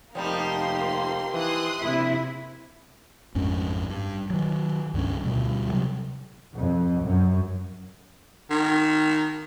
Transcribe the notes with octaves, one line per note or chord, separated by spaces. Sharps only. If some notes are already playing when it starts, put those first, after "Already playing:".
F1 F3 G3 A#3 D#4 C6
E3 C6 D#6 F#6
A#1 C3 E4
A1 F2 G#2 C#4
G2
D#3 F#3
C#2 G2 F3 C#4
D2 B2 G3
C3 F#3
F2
F#2
D#3